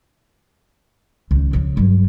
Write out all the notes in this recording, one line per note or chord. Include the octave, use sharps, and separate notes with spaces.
C#2 D#3
C#3 F3
G2 F#3